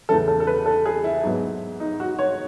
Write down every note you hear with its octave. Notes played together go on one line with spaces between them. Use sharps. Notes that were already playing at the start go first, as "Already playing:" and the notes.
E2 C#3 E3 A4
A4
A4
B4
A4
G#4
E4
G#2 F#3 B3
D#4
F#4
C#5